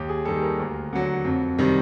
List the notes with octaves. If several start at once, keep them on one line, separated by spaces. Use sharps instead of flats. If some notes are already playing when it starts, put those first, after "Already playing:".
Already playing: D#2 G4
G#4
D#3 G3 A4
A#4
D2
D3 F#3
F2
C3 D#3 G3